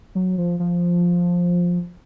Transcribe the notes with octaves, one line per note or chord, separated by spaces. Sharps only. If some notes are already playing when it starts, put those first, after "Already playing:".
F#3
F3
F3